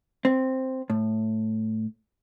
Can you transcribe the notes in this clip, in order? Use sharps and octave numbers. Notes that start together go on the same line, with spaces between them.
C4
A2